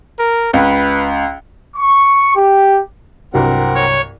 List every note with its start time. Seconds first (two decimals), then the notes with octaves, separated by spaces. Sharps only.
0.19 A#4
0.53 C#2 B4
1.76 C#6
2.36 G4
3.34 C2 G2 F#3 C4 A#4 F#5
3.75 C#5